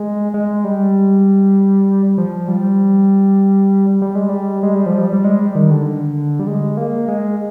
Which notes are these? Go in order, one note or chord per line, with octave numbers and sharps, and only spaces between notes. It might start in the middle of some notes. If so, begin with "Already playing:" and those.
Already playing: G#3
G#3
G3
F3
G3
G3
G#3
G3
G#3
G3
F3
G3
G3
G#3
G3
D#3
D3
G3
G#3
A#3
G#3